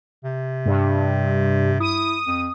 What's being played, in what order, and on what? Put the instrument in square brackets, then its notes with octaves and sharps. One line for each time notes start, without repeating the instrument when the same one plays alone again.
[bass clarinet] C3
[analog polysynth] G2
[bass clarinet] E4 [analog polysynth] D#6
[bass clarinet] F2